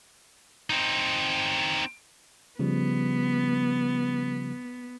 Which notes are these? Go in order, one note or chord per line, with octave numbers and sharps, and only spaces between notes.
C4 D#4
C#3 F3 G3 B3